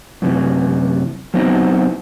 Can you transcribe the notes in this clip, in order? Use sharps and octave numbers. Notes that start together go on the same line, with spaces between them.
F#2 C3 E3
F#3 B3 C4 D#4 E4 F#4